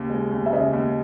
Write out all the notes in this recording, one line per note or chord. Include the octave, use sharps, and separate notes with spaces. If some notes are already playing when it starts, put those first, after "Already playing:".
Already playing: D#2 C#3
G#3
D#2
E5
C#3 D#5
D#2